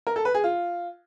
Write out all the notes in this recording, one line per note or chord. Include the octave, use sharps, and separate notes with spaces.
A#4
A4
B4
G#4
F4